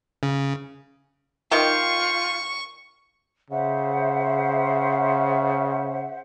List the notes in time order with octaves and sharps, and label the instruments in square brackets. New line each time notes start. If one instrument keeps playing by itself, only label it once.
[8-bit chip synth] C#3
[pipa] D#3 D#4 G4 [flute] F4 [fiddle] C#6
[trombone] C#3 [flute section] C5 E5 F#5